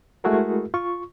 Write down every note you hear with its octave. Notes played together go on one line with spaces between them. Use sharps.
G#3 A3 E4 F#4 G#4 A#4
F4 C#6